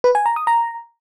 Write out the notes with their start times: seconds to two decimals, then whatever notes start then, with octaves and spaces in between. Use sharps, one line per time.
0.04 B4
0.15 G#5
0.26 A#5
0.36 D#6
0.47 A#5